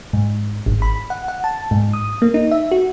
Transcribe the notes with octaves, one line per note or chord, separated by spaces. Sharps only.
G#2
G#1
B5
F#5
F#5
A5
G#2
D#6
A#3
D#4
E5
F#4